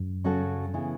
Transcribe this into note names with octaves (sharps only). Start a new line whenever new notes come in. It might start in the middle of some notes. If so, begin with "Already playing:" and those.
Already playing: F#2
C#3 F#3 C#4 F#4 A4
C#3 E3 B3 E4